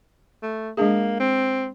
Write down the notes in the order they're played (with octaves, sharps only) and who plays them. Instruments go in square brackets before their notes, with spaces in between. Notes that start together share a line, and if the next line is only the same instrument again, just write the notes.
[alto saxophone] A3
[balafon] G#3 D4 G#4 [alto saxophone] A#3
[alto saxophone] C4